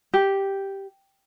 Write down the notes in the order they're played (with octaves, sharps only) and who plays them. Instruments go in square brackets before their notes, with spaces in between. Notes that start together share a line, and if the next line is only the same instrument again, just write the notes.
[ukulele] G4